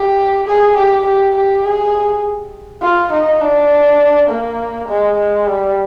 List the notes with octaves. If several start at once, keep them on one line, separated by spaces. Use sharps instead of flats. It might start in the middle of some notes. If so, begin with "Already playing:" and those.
Already playing: G4
G#4
G4
G4
G4
G#4
F4
D#4
D4
A#3
G#3
G#3
G3